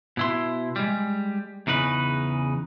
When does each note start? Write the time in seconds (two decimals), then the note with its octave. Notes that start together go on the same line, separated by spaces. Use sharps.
0.17 B2 E4 C6
0.76 G3 G#3
1.67 E2 C#3 D#4 B4